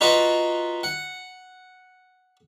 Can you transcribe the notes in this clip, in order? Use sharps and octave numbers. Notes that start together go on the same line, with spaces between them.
D#4 F4 F#4 B4 D#5
F#5